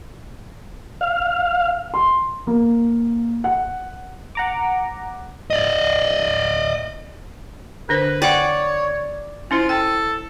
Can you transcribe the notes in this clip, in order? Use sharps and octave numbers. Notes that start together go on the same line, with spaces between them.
F5
C6
A#3
F#5
F#5 A#5 D6
D5 D#5
D3 D4 B4 C5
C#5 D5 F#5 G5
C#4 E4 F4 C5
A4 G5